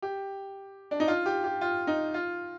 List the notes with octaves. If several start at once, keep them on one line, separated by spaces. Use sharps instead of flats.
G4
D4
D#4
F4
G4
G4
F4
D#4
F4